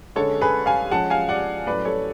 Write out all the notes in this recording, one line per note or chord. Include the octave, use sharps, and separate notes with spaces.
D3 G#3 C#4 A4 C#5
G#4 B4
F5 G#5
F3 G#3 C#4 F#5 A5
F5 G#5
D5 F#5
A2 F#3 A3 C#4 B4 D5
A4 C#5